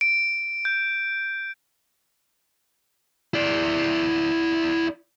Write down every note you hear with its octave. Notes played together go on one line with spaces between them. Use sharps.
D7
G6
E4 D5